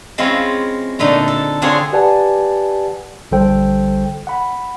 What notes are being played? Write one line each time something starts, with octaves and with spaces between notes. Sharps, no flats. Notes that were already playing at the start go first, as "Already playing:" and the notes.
G#3 C4 C#4 E4 F4
A#2 D3 A3 D#4
A4
D3 C4 F4 G#4 C#5 C6
G4 B4 D5 F#5 G#5 A5
A#1 D3 G3 A4 C5 G5
F#5 B5